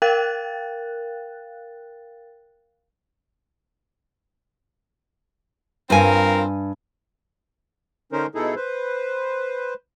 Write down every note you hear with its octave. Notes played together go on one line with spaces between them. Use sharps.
A#4 F5 G5 F#6 A6
G2 C4 F4 A#4 G#5
D3 C#4 D#4 A#4 C5
B2 D#4 E4 G#4 A4
B4 C5